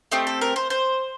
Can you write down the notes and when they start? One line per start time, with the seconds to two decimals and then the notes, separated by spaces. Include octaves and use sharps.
0.11 A3 C4 G4 D#5
0.27 A4
0.41 A#4
0.56 C5
0.70 C5